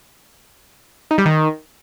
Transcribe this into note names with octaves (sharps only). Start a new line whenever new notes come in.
D#4
G3
D#3